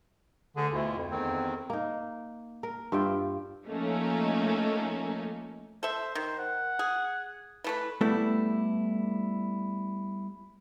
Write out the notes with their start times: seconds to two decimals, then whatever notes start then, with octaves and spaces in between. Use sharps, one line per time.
0.56 D2 D3 G#4
0.73 D2 B2 E4 F4
0.97 F2
1.11 E2 D#3 C4
1.70 A#3 D#4
2.63 A#4
2.92 G2 F4 E5 G5
3.67 F3 A3 A#3 C#4 D#4
5.83 A4 C5 E5
6.15 D#3 C5
6.38 F#5
6.79 G#4
7.64 E3 A3 B4
8.01 G3 A3 B3 E4 A4